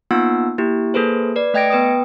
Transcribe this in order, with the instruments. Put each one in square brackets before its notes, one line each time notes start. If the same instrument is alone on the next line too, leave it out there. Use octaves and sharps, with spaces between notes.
[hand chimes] A#3 B3 D#4 F4 F#5 E6
A#3 E4 G4
A#3 G#4 A4 B4 C5
B4 D5
A3 D#5 G5 G#6 A#6 D7
B3 B4 G5 D#6